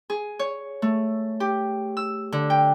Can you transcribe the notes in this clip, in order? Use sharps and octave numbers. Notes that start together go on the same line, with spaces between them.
G#4
C#5
A3
G4
E6
D3
G5